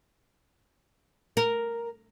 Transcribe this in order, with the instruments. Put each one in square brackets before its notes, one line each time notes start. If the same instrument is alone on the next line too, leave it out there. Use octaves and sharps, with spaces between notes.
[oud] A#4